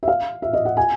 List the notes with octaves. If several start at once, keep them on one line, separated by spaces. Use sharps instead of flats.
E5
F5
E5
D#5
F#5
G#5